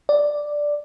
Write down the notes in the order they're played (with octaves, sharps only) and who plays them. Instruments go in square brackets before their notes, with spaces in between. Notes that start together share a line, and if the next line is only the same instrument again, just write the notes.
[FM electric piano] D5